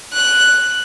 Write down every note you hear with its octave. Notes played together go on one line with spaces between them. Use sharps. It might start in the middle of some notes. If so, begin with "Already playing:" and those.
F#6